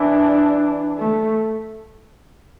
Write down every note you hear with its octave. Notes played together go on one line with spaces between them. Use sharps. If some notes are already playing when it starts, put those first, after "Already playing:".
Already playing: E3 D4 E4
A3